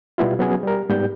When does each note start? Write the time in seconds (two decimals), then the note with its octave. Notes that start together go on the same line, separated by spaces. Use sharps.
0.18 B2 G3 B3 E4 F4
0.39 F#3 B3 C#4 F#4 G#4
0.63 G3 A#4
0.90 G#2 G3 B3 G6